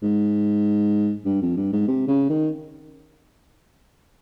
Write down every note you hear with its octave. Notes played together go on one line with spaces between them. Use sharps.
G#2
G2
F2
G2
G#2
C3
C#3
D#3